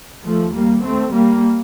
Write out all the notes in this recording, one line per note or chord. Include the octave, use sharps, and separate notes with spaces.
D#2 F3 A3
G3 A#3
A3 C4
G3 A#3